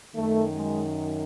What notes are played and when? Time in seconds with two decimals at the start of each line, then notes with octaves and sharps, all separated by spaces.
0.15 F#2 D#3 A3
0.55 G#3